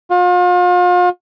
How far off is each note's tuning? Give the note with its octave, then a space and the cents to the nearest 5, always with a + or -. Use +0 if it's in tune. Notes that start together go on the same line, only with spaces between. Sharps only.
F4 +40